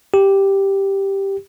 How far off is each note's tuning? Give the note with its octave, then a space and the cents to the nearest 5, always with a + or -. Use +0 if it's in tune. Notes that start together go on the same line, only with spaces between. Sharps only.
G4 +0